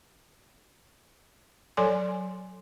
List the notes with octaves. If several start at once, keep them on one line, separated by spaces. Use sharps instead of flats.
F#3 A4 C#5 D5 G#5 C6